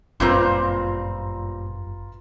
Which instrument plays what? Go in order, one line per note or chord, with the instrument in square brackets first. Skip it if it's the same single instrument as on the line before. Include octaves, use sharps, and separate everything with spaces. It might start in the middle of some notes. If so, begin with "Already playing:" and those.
[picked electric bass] G1 F#2 [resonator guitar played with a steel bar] A#2 G3 C4 [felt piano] F4 B4 A#5